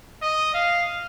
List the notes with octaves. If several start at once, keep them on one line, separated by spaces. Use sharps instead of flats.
D#5
F5